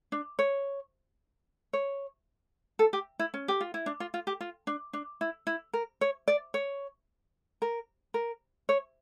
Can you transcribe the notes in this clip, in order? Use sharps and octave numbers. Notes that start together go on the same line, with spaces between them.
D4
C#5
C#5
A4
G4
E4
C#4
G4
F4
E4
D4
F4
F4
G4
F4
D4
D4
E4
E4
A#4
C#5
D5
C#5
A#4
A#4
C#5